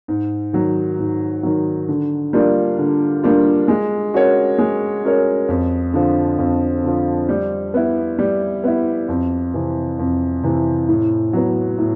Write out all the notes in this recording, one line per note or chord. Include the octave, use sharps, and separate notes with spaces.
G#2
D#3 F#3
G#2
D#3 F#3
D3
G3 A#3 D4 F4
D3
G3 A#3 D4 F4
G#3
C#4 F#4 A#4 C#5
G#3
C#4 F#4 A#4 C#5
F2
D3 F3
F2
D3 F3
G3
B3 E4
G3
B3 E4
F2
C3 E3
F2
C3 E3
A2
F#3 B3
A2